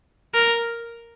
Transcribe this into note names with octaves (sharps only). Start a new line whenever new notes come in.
A#4